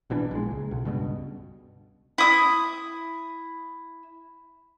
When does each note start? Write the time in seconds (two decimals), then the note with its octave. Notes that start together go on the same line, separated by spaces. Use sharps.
0.10 A#1 B2 E3 D4
0.31 A#1 G#3
0.51 C#2
0.71 B1
0.85 C#2 G2 B2
2.18 E4 D#6